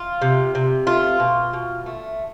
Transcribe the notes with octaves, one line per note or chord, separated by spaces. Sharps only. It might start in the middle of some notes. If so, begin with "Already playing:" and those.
Already playing: F4
C3
C3
A3 F4
B2
B2
A3